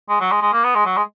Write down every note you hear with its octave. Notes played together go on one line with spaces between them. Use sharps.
G#3
F#3
G#3
G#3
A#3
B3
G#3
F#3
G#3